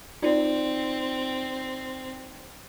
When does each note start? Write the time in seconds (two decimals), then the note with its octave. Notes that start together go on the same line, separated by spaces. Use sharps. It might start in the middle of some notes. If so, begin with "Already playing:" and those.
0.22 C4 D#4 F4 D5